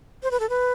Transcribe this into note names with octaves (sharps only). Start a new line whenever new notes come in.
C5
B4
A4
B4